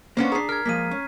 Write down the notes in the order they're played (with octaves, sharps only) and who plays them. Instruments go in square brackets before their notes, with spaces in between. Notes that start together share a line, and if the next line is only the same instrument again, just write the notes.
[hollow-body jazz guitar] A#3 D4 [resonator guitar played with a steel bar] B3 C#4 C5
[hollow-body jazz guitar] D4 G#4 [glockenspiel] A#5 B6 C7
[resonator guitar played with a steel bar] A#4 [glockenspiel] F6 G#6
[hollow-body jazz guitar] F3 G#3 A#3 [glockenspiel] B6 D#7
[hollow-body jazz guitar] C#4